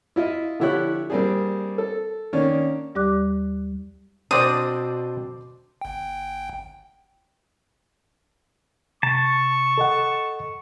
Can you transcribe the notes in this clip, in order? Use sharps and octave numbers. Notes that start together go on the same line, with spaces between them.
E4 F4 D#5 E5
D3 F3 E4 G4 C#5 F#6
G3 A#3 C4 D4 G#4
A4
D#3 A#3 C#4 D4
D#2 G3 G4 D5 D6 F#6
B2 C4 D4 C5 D5 D#6
G1 G5
C3 A5 C#6
A4 D#5 F#5